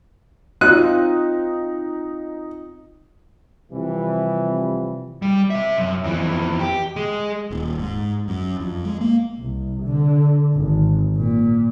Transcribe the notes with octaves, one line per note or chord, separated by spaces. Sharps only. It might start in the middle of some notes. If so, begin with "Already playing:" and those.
C4 D#4 F4 F#4 F#6
C3 E3 F3 G3
G3
C3 E5
F#2
F2 E3
G4
G#3
D#1
G#2
F#2
F2
G#3
A#3
C2
D3
G#1
A#2